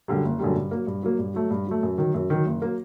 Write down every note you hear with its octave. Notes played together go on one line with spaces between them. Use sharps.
F#2 D3 G3
F#1
F#2 D3 G3
G2
F#3 A#3
G2
F#3 A#3
G2
F#3 A3
G2
F#3 A3
F#2
D#3 F#3
F#2
D#3 F#3
F#1
F#3 A#3